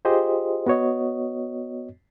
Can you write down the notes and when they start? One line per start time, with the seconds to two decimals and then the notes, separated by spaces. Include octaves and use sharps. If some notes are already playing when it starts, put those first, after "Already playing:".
0.05 F4 G4 G#4 C5 D#5
0.66 B3 F#4 C#5 D#5